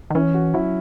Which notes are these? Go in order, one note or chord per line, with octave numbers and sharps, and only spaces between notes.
D#3
E3 C#4
F#4
F#3 E4